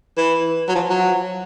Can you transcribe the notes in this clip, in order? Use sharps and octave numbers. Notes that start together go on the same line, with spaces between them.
E3
F#3
F3
F#3